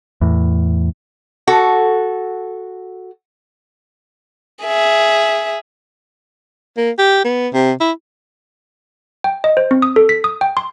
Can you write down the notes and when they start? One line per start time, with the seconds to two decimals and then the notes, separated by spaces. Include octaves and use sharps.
0.21 E2 A2
1.47 F#4 A4
4.64 G#4 E5
6.77 A#3
6.98 G4
7.25 B3
7.54 C3
7.80 E4
9.24 G5
9.44 D#5
9.57 C5
9.71 C4
9.82 D#6
9.96 A4
10.09 B6
10.24 D#6
10.41 G5
10.57 C6